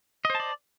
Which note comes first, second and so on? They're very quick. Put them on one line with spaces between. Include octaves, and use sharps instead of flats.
D#5 C5 A5 D5